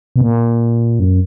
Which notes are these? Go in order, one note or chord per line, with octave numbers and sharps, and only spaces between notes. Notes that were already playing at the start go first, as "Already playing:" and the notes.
B2
A#2
F#2